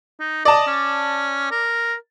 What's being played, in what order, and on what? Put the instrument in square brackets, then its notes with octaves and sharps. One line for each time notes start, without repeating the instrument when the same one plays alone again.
[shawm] D#4
[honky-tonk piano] D5 A5 [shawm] D#5
[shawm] C#4
A#4